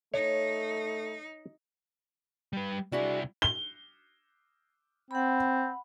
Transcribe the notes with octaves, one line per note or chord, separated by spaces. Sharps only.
A3 D#4 C#5
G3 B4
C2 D4 E4 F#4 G#4
G7
C4 F#5 B5